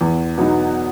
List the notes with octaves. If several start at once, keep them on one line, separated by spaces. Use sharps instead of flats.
E2
B2 F#3 B3 D#4